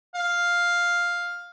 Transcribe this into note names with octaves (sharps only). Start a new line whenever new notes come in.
F5